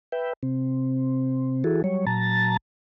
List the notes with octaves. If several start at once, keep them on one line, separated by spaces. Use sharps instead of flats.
B4 E5 G5
C3 C4
E3 E4 F#4 G#4 A4
F#3 G3 C#5
A#2 F#3 A5 A#5 A6